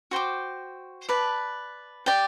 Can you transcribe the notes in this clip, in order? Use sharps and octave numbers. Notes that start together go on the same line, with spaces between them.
F#4 C5 G5 D6
B4 D5 A5
G4 D5 G5